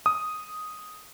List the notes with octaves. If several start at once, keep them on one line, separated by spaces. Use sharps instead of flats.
D#6